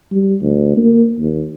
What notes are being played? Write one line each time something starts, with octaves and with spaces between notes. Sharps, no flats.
G3
D2
A#3
D#2